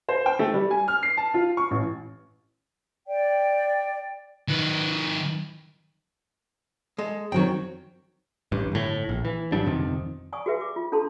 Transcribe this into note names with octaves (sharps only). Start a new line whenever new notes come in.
C5
G5
A3
G3
G#5
F6
C7
A5
F4
C#6
A1
D5 G5
D#3 B4
G#3 A4
D#3 F#3 C4 F#4 G5
A1 G2
G1 A2
A#1
E3
G#1 F#3 G3 D4
G1 F2 C3 D#3
D5 G#5 C#6 D#6
F#4 G#4 B4 E5
D6
F4
D4 A4 A5 C6